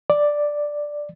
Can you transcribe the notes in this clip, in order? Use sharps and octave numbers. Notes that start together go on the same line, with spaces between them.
D5